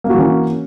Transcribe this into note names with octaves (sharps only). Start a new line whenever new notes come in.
E3 A#3 C#4 F#4